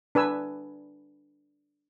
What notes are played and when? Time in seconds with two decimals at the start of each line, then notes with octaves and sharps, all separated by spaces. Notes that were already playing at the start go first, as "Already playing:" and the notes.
0.15 D4 B4 G#5 E6